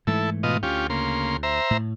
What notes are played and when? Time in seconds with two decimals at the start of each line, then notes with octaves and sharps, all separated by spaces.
0.07 G#2 E3 A3 E4 A4
0.43 B2 F4 D#5
0.63 D2 C#4 F4 G4
0.90 C#3 A#3 C6
1.43 C5 E5 A#5
1.71 A2